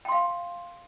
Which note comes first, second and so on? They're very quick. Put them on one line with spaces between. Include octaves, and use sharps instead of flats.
G5 C6 F5